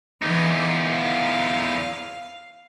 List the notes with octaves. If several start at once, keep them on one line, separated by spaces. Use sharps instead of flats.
E2 E3 D#4 D6
F5